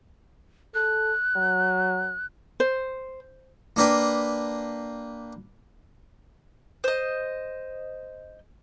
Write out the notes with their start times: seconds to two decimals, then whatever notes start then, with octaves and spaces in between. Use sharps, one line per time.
0.74 A4 F#6
1.37 F#3
2.60 C5
3.76 A#3 D4 B4 G5
6.84 C5 D#5